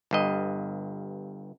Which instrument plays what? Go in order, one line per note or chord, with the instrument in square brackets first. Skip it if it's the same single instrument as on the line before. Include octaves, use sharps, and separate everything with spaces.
[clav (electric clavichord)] G1 G2 D#5